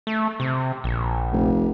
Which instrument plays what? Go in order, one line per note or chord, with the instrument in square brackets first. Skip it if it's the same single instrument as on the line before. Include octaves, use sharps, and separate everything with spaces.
[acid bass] A3
C3
A#1
[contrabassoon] F1